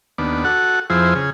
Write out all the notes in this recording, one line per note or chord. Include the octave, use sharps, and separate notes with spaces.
D#2 B3 D4
F#4 A4 F#5
F2 F3 E4 G#4 C5
C#3 G#4